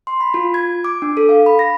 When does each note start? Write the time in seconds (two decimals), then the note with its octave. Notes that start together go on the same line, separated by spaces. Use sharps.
0.07 C6
0.20 B5
0.34 F4
0.54 G#6
0.84 D6
1.02 D4
1.17 A4
1.29 F5
1.46 B5
1.59 A#6